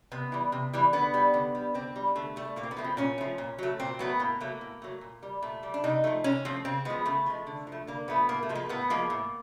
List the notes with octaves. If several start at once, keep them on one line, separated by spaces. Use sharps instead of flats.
C3 B3
E3 G3
C3
E3 G3
D3 B3
G3
D3
G3
D3 C4
G3
D3 A3
G3 A3
A#2 A#3
C4
B3
F3 A3
C4
A#2 C#4
F3 A3
A#2
F#3 A3
A#2 C4
F#3 A3 B3
A2 A#3
F#3 A3 A#3
A2
F#3 A3
A#2
G3
A#2 A3
G3
D4
C3 D#4
F3 A3
C3 C#4
F3 A3 C4
C#3 C4
F3 G#3 B3
C#3 A3
F3 G#3
D3
F3
A3
D3 A#3
F3 A3 B3
A2 A#3
A3
F3 G#3
A#3
A2 B3
F3 G#3 A#3
A2